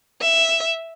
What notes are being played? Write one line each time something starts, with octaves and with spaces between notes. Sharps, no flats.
E5